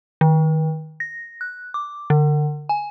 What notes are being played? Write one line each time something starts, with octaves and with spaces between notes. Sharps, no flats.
D#3
A#6
F#6
D6
D3
G#5